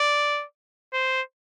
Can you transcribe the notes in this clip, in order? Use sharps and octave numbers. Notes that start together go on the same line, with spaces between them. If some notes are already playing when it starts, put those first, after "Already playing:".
Already playing: D5
C5